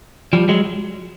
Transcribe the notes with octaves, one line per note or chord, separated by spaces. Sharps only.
F3 G3
F#3 G#3